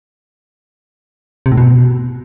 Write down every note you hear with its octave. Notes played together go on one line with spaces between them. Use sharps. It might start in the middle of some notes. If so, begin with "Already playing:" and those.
C3
A2
B2